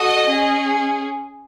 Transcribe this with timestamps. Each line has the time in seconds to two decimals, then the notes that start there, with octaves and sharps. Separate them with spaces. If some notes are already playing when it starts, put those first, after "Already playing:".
Already playing: F#4 A4 D#5
0.28 C#4 G#4